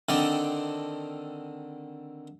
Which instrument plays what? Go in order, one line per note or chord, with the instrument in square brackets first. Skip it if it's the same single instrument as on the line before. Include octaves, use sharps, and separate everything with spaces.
[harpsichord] D3 D#3 C4 A4 D5